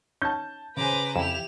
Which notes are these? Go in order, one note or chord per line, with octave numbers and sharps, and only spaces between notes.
C#4 D#4 A5 G6
C#3 B4 C5 G#5 A#5 D6
F2 E4 G4 E7 F7